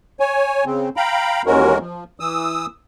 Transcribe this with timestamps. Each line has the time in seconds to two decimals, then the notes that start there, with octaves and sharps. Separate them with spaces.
0.20 C#5 G#5
0.65 C#3 C4
0.96 F5 G5 A#5 B5
1.46 D#2 E3 G#3 C#4 F#4 A#4
1.80 F3
2.20 E3 D#6 E6